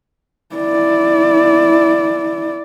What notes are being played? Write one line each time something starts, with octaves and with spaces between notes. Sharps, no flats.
E4 D5